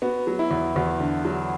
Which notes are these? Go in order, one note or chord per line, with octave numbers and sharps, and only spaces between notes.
B3 F#4
F#3
E4
E2
E2 F#4
D3
F#3